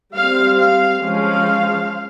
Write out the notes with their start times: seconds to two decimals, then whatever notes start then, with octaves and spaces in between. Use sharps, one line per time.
0.15 G3 C4 F5
0.58 F5
1.01 F3 G#3 C#4 F5